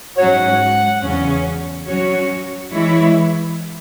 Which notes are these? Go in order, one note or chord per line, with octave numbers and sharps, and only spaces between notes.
G#2 F#3 C#4 F#4 C#5 F#5
E2 C#3 F#3 C#4
F#3 C#4 F#4 C#5
E3 G#3 E4 C#5